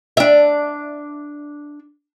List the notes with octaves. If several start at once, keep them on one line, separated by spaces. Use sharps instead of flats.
D4 E5